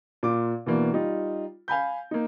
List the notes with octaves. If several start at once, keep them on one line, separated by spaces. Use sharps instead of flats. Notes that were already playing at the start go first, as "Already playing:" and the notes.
A#2 F4 D6
B2 E3 A#3 D4
G3 D#4 F4
F5 G#5 B5 G6
A#3 D#4